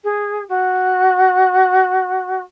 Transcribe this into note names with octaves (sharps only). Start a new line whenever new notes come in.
G#4
F#4